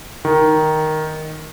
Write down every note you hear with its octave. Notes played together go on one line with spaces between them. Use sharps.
D#3